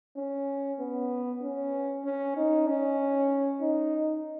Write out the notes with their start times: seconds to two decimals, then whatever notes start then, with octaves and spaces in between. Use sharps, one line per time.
0.17 C#4
0.79 B3
1.42 C#4
2.05 C#4
2.37 D#4
2.68 C#4
3.61 D#4